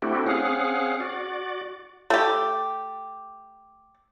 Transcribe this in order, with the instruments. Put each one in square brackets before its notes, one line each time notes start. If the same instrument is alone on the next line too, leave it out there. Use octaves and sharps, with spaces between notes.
[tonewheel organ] A3 C4 D4 E4 F#4 G4
C4 C#4 G#4 F5 F#5
F#4 D5
[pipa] A3 G4